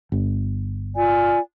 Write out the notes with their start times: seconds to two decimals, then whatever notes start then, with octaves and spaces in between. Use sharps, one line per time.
0.12 G1
0.96 F4 D5 G#5